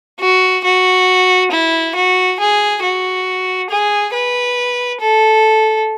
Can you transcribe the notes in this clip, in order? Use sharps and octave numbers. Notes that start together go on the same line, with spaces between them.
F#4
F#4
E4
F#4
G#4
F#4
G#4
B4
A4